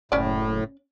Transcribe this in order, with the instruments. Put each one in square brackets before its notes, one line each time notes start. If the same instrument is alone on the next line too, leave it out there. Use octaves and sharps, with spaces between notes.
[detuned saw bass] F#1 [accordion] A2 [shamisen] C#4 D5